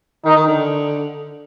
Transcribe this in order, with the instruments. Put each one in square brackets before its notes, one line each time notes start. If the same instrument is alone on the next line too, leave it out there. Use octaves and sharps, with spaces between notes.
[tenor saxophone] D#3 [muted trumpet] D#4
[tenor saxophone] D#3
D3